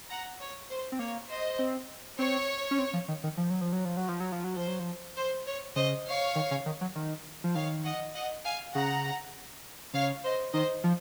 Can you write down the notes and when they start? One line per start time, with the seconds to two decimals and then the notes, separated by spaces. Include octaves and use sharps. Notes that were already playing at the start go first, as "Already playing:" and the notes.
0.09 F#5 A#5
0.40 C#5
0.70 C5
0.92 C4
0.99 A#3 C#5
1.29 C5 D#5
1.59 C4
2.18 C4 C#5
2.71 C#4
2.79 C4
2.93 F3
3.08 D#3
3.23 D#3
3.37 F3
3.50 F#3
3.61 F3
3.73 F#3
3.85 F3
3.97 F#3
4.08 F3
4.20 F#3
4.32 F3
4.44 F#3
4.56 F3 C5
4.67 F#3
4.80 F3
5.16 C5
5.47 C#5
5.76 C#3 C5 D#5
6.06 C#5 F5
6.35 D#3
6.51 C#3
6.66 D#3
6.81 F#3
6.95 D#3
7.44 F3
7.55 D#3 C#5 F5
7.85 D#5 F#5
8.14 D#5 F#5
8.45 F5 G#5
8.74 C#3 F#5 A#5
9.94 C#3 C#5 F5
10.23 C5 D#5
10.53 D#3 C5 D#5
10.84 F3